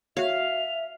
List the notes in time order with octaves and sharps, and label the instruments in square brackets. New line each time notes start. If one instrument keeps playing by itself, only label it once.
[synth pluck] F#4 C#5 [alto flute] E5 [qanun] F5 [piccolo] F7